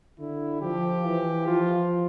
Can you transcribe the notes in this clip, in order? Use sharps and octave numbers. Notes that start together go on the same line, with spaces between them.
D3 E4
F3 G4
E3
F3 F4